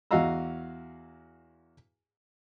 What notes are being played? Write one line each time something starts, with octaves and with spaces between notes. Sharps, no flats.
E2 F#4 D#5 F5 A#5 E6